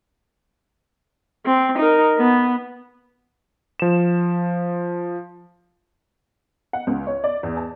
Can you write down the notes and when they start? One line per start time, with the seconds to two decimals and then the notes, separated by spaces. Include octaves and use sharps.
1.46 C4
1.79 D#4 A#4
2.18 B3
3.80 F3 E7
6.73 F#5
6.87 C#2
7.07 C#5
7.24 D5
7.43 E2
7.57 A5